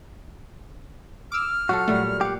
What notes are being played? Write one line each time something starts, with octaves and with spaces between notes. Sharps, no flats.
D6 E6 F6
F#3 F4 F#4 A4
A#2 F#3 G3 A3
G4 F5 F#5